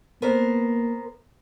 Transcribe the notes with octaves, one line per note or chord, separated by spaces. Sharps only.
A#3 B3 A#4 C5